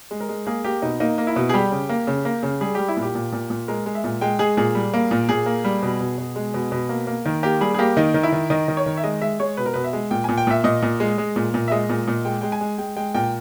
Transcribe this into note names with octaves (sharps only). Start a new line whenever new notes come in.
G#3
A#4
G#3
A#3 G#4
A#3 G4
B2 D#4
A#3 D#4
A#3
E4
B2
G#4
G3 G4
C#3
A#3
C#3
A#3
C#3
G3 G#4
G3 G4
E4
A#2
G4
A#2
A#2
A#2
G#3 A#4
G#3
E5
A#2
G#3 G5
G#3 G#4
A#2 G#4
G3
A#3
A#2
A#2 G#4
A#3
G3
B2
B2
B2
G#3
B2
B2
A#3
A#3
D#3
A#3 G4
G3 G#4
G#4
A#3 G4
D#3 D#4
D#3
E4
D#3
D#3 D#5
D#3
C#5
D#3
E5
G#3 D#5
G#3 E5
G#3 C#5
B2 B4
A#4
B2 B4
E5
G#3
A#2 G5
A#2 G#5
G5
A#2 E5
A#2 D#5
A#2
G#3
G#3
A#2
A#2
E5
G#3 D#5
A#2
A#2
G#3 G5
G#3 G5
G#5
G#3
G#3 G5
G#3 G5
A#2 G5